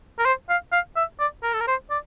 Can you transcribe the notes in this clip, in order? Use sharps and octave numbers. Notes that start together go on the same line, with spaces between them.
A#4
C5
F5
F5
E5
D5
A#4
A4
A#4
C5
D5